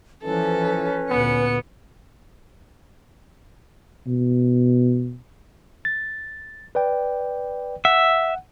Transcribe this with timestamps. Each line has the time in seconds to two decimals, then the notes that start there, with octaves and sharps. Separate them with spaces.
0.22 E3 F3 C#4 A4 B4
1.10 D2 A#2 B3 C#7
4.07 B2
5.85 A6
6.75 B4 D5 G5
7.85 E5 F#5